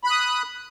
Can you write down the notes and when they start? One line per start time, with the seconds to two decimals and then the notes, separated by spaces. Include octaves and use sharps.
0.04 B5
0.07 F#6
0.10 D#6